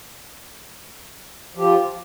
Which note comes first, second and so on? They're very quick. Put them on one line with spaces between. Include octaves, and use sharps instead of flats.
F3 G4 F4